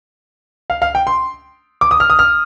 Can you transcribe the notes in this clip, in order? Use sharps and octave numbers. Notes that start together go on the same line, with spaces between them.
F5
F5
G5
C6
D6
D#6
F6
D#6
F6